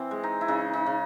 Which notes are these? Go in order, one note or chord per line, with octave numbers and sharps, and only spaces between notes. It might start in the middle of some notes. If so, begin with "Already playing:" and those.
Already playing: E3 C4
G#3
D#4
E4
C#3 D#4
D#4
C#3